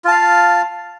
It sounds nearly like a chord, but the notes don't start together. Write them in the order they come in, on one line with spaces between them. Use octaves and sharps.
F4 A5 F5